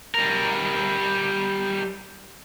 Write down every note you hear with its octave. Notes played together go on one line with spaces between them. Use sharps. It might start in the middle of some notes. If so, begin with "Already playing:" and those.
G3 A#4